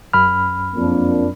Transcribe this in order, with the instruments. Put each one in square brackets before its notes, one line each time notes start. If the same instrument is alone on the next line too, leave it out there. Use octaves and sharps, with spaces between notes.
[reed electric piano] F#2 B5 F6
[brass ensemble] F2 A#3 D4